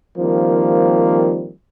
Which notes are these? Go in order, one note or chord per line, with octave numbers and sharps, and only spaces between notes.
D#3 F3 G3 A#3 C4